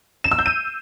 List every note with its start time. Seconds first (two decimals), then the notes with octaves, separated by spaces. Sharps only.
0.24 E7
0.31 E6
0.39 G6
0.46 D#7